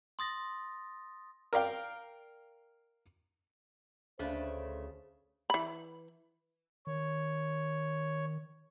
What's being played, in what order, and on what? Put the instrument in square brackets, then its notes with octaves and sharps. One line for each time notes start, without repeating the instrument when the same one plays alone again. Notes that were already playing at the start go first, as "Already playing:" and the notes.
[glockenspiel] C6 D#6 A6 A#6
[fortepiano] A#4 D5 F5 G5
[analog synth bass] D2 [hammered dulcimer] C#3 [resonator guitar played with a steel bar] A3 D4 B4 [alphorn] C5
[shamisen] E3 B5
[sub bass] D#3 [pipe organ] C#5